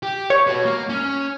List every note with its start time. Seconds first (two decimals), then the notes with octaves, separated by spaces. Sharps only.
0.03 G4
0.30 C#5
0.47 F#4 B4
0.65 A#3
0.90 C#4